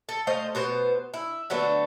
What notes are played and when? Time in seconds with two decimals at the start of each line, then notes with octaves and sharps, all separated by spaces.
0.09 A4
0.27 A3 C5 D#5 F5
0.55 B2 B3 C5
1.14 E4
1.50 D3 F#3 A3 B3